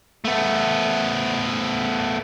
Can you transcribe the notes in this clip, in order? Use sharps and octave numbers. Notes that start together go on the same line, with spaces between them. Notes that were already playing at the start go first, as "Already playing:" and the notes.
A3 B3